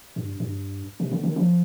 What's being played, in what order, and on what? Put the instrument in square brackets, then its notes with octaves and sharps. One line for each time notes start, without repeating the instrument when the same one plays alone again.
[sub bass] G2
G2
C3
D3
D#3
F3